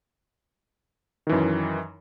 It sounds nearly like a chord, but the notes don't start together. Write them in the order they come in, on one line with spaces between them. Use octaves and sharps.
D#3 E3 F#2